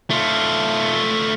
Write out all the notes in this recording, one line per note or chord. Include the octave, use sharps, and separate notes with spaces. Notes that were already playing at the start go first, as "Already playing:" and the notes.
A3 F4